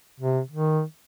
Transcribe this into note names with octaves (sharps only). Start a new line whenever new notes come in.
C3
D#3